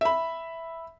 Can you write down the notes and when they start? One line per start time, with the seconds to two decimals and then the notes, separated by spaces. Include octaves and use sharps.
0.01 E5 B5